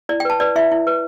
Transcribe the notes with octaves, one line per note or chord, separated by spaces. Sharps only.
E4 D5
G5
B4 A5
B4 D5
E4 E5
E4
B4